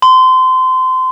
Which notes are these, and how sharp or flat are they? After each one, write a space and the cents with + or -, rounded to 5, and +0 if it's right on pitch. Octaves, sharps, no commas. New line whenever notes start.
C6 -25